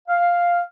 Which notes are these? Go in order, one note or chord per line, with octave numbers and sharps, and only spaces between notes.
F5